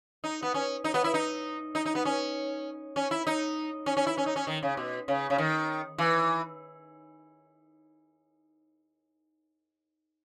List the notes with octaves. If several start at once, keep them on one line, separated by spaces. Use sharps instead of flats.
D#4
B3
C#4
D#4
B3
E4
D#4
D#4
D#4
B3
C#4
C#4
E4
D#4
C#4
C#4
E4
C#4
D#4
C#4
D#3
C#3
B2
C#3
C#3
D#3
E3